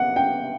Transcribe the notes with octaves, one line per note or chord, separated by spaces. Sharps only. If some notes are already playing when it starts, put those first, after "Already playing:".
Already playing: F#5
G5